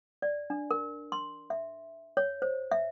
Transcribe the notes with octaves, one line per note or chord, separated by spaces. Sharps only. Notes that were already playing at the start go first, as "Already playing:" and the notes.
D5
D4
A#4
C6
E5
C#5
C5
E5